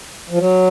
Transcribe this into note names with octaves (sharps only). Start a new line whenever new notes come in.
F3
F#3